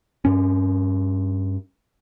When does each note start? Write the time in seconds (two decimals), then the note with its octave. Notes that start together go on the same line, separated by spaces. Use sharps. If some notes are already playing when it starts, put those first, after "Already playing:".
0.25 G2 C#4